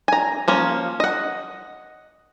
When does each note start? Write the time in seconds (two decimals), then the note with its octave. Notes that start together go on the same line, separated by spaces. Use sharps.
0.08 G#5 A#5
0.48 F3 A#3 C#4
1.00 D#5 F#5